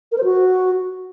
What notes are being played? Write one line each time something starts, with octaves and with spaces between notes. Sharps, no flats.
A#4
C5
F#4